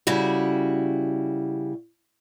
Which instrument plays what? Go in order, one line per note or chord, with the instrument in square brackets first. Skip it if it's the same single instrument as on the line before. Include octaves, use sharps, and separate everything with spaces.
[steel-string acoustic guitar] C#3 G3 E4 F#4